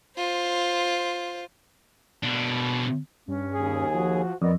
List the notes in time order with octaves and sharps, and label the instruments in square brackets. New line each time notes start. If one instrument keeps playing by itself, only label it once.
[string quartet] F4 C5
[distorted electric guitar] B2 D4
[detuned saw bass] G2 [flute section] C#4
[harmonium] D#2 G#4
[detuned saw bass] F3 [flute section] F#4
[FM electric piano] F2 [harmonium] B3 [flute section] A#4 D5 D#5